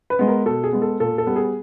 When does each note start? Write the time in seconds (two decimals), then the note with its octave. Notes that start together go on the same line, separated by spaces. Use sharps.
0.10 B4
0.19 G#3 B3
0.28 A#4
0.45 B2 A4
0.64 G#4
0.73 G#3 B3
0.82 A4
1.00 A#2 A4
1.18 A4
1.27 G3 B3
1.36 G#4